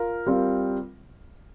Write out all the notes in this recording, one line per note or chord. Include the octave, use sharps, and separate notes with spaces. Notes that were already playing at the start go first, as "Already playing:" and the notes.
Already playing: F4 A#4
G3 C4 F4 A#4